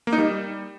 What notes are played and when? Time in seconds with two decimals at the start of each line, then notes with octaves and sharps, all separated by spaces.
0.07 A#3
0.13 D#4
0.18 G3